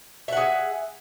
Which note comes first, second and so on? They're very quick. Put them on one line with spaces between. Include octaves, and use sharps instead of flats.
E5 F#5 G#4